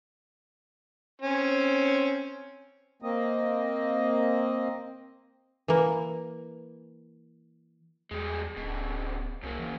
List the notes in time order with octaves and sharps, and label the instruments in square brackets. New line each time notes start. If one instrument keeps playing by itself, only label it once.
[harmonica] C4 C#4
[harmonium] A#3 C4 D#5
[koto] E3 A#3
[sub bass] E2 [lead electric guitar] G3 G#3
[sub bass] D1 [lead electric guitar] B2 D3
[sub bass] C2 [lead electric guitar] F#2 A#3
[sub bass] E3